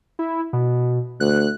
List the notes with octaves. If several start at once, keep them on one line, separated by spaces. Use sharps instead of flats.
E4
B2
D2 F#6